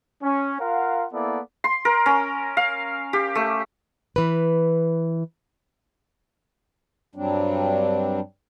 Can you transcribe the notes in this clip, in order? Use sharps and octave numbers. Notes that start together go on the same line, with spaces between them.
C#4
F4 A#4 F5 F#5
A#3 B3 E4 A4 D5
C6
A#4
C#4
F5
G4
A3
E3 B4
G2 F#3 G3 C4 D4